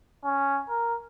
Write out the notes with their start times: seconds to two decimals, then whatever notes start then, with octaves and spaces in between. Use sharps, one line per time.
0.24 C#4
0.70 A#4